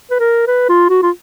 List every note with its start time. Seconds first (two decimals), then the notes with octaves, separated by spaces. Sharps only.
0.11 B4
0.19 A#4
0.47 B4
0.69 F4
0.89 F#4
1.03 F4